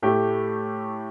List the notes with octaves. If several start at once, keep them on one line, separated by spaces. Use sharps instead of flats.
A2 A3 G4